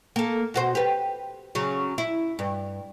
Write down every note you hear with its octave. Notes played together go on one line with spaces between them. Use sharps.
A#3 A4
B2 F#4 C5
G4 B4
C#3 F#3
E4
G2